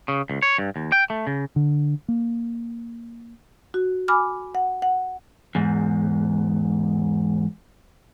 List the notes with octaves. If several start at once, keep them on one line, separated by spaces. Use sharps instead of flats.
C#3
C#2
C#5
G2
D#2
G5
A3
C#3
D3
A#3
F#4
G#5 B5 D6 F6
F#5
F#5
E2 G#2